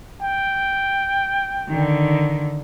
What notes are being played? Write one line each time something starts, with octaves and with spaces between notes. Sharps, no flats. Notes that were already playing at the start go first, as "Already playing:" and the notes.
G5
D3 D#3